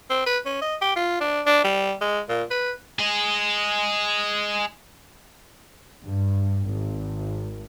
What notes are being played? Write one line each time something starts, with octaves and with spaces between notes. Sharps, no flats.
C4
B4
C#4
D#5
G4
F4
D4
D4
G3
G#3
A#2
B4
G#4 D#5
G2
G#1